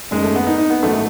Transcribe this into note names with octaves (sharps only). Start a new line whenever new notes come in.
F#1 F#2 D#3 G#3
A3
B3
D#4
D#4
B3
A1 G#2 D#3 F#3 A3